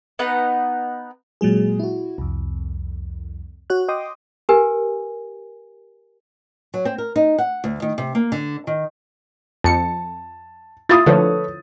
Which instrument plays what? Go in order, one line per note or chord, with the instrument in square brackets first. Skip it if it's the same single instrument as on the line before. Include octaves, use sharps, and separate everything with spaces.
[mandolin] B3 D#4 B4 F#5
[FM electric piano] A#2 F#3 G#3 G#4
E4 F#4
C2 F2
F#4 C#5 F#6
D#5 G5 C6 D6 D#6
[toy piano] G4 A#4 B4 G#5
[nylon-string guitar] F#3
C4
A#4
D#4
F#5
D2
D#3
C3
A#3
D3
D#3
[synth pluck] F2 C#7 [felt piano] A5
[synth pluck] E4 F4 [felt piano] D#6 A6
[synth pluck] D3 F3 A3 [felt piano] A4 B4 C#5